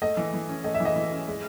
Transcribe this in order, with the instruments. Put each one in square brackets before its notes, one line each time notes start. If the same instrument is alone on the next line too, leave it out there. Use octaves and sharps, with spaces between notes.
[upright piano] A3 D#5
E3
E3
C#4
A3 D#5
E5
E3
D#5
E3
C#4
G#3